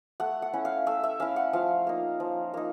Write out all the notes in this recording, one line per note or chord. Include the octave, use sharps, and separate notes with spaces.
A3 F#5
F#5
C#4 E4
F5
A3 E5
E5
C#4 E4 F5
F#5
F3 F5
A#3 D#4
F3
A#3 D#4